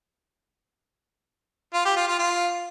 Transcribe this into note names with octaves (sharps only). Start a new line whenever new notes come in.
F4
G4
F4
F4
F4